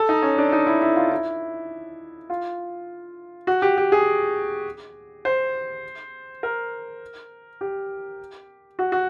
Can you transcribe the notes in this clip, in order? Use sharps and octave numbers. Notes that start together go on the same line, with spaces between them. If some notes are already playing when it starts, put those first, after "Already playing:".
Already playing: A4
D#4
C#4
D4
D#4
E4
E4
F4
E4
F4
F#4
G4
G4
G#4
C5
A#4
G4
F#4
F#4